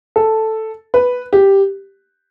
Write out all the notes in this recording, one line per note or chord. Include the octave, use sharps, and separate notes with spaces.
A4
B4
G4